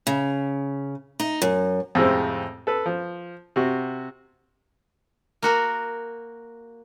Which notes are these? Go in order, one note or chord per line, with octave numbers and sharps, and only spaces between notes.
C#3
D#4
F#2
F2 A2 C3 G#3 C4
A4 B4
F3
C3 F#4
A#3 F#4 A#4